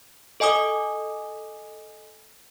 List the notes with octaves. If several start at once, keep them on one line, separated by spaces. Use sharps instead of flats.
A4 D#5 G#5 D6 D#6